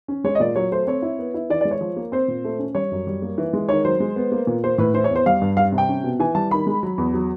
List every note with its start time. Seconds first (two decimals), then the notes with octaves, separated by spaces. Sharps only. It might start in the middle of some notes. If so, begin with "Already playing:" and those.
0.08 C#4
0.24 G#3 C#5
0.35 D#5
0.40 A#2 D5
0.56 F#3 C#5
0.72 A3 C5
0.87 C4 C#5
1.02 E4
1.19 B3
1.34 E4
1.50 E3 D5
1.61 D5
1.65 G#3
1.71 C#5
1.81 F3
1.96 A#3
2.12 C4 C5
2.28 A#2
2.44 A3
2.59 C#4
2.75 G3 C#5
2.91 F#2
3.07 G3
3.22 A#3
3.38 E3
3.53 G#3
3.69 D#3 C#5
3.85 F#3 C5
4.00 G#3
4.16 B3
4.32 A#3
4.47 A#2
4.64 A#3 C5
4.78 A2 B4
4.94 E3 C5
5.04 C#5
5.11 E2 C5
5.26 G3 F5
5.41 G2
5.57 G3 F5
5.72 C3
5.78 G5
5.89 C#4
6.03 B2
6.20 E3 G#5
6.35 G3 A5
6.51 D#3 B5
6.67 G#3
6.83 F#3
6.98 E2
7.14 F#3